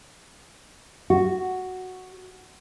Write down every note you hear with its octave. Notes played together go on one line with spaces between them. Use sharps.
F#4